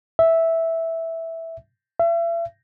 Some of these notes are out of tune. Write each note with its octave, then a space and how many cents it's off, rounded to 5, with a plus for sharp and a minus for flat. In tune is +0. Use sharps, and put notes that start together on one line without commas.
E5 -5
E5 +40